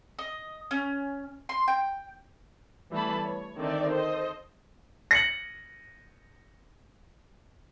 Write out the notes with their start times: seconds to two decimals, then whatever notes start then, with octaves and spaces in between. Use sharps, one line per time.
0.19 D#5
0.71 C#4
1.49 C6
1.68 G5
2.91 E3 G3 A3 B3 A5 B5
3.23 C#5
3.59 D3 D#3 C4 D#4 D5 E5
3.92 A4 C5 D#5
5.11 A#6 C#7 F#7